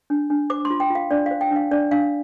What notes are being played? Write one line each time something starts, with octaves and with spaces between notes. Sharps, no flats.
D4
D4
C5 D6
C6
F4
G5
F4
F5
D4 D5
C5 F5
G5
D4 F5
D4 D5
D4 F5